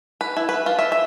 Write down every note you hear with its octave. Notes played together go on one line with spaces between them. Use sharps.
B4
E4
B4
F4
E5
E5